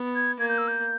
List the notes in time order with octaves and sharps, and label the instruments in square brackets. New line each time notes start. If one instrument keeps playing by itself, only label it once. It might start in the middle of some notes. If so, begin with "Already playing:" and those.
Already playing: [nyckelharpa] B3
[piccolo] G#6
[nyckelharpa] A#3 [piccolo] G#6
[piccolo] G6
E6
G6